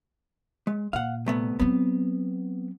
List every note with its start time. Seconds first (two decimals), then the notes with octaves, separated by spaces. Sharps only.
0.67 G#3
0.93 A#2 F5 F#5
1.26 C2 A3 B3
1.59 F#3 B3 C4